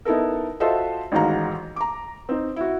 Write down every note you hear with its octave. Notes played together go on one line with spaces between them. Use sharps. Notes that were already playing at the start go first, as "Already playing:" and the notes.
B3 D#4 E4 A4 A#4
F4 F#4 A4 C5 D#5 E5
A1 G#2 D#3 F#4 F5 A#5
A#5 D6
C4 D#4
E4 F#4